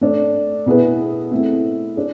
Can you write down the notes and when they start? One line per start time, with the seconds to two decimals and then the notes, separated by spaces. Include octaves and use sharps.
0.01 A3 D4 A4
0.66 B2 B3 E4 G#4 B4
1.32 A3 C4 E4
1.96 D4 G#4